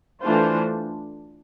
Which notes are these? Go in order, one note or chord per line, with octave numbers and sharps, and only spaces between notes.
E3 A3 D4 F4 C5